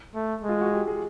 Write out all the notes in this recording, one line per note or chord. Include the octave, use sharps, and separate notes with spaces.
A3
G#3
F4
F#4
G4
G#4